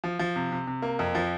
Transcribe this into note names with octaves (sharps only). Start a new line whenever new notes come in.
F3
F3
C3
C3
C3
A#3
F2
F3